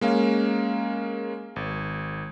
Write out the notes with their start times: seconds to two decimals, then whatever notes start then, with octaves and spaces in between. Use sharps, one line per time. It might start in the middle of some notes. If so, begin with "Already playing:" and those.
0.01 G#3 A#3 C#4 F5
1.56 G#1